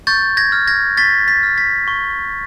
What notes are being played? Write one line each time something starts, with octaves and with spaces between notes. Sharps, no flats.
C#6 G6 A6
G#6 A#6
F6
G#6 A#6
C#6 A6 B6
A6 B6
F6
A6 B6
C#6